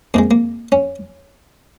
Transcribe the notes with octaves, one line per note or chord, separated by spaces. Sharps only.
F2 D#3 G#3 A#3
A#3
C#4